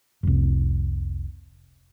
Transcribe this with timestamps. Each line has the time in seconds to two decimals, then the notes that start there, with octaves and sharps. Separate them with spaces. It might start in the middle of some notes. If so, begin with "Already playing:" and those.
0.23 F1 C2